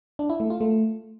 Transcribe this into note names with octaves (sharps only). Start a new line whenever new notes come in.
D4
E4
A3
F4
A3